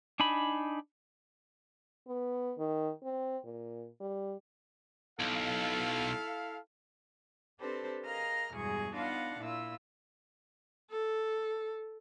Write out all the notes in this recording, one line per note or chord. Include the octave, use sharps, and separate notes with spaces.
D4 D#4 G#5 B5
B3
D#3
C4
A#2
G3
B1 E4 A4 F5
C4 D4 G4 A4 B4 C5
G#4 A#4 D#5 F5 A#5 F6
E2 G2 B2 G#3 G#4 C#6
B3 D4 D#4 F4 F5 F#5
A#2 E4 F4 E6
A4